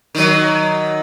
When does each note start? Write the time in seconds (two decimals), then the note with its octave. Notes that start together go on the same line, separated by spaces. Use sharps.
0.15 D#3 F#3